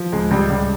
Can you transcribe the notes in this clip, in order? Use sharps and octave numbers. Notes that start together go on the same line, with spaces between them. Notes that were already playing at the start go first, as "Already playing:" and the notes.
Already playing: F3
C#2 G#3
C#2 G3
C#2